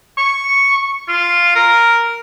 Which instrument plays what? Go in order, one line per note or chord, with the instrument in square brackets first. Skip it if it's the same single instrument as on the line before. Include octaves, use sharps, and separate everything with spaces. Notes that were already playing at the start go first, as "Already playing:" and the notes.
[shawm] C#6
F4
A#4